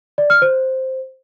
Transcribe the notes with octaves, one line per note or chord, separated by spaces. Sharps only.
D5
F6
C5